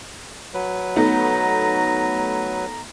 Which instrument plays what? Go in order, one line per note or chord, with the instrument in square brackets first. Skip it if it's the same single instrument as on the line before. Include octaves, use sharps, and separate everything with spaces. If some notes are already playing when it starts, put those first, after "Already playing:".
[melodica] F#3 B4
[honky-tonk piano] A3 B3 D#4 [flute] A#5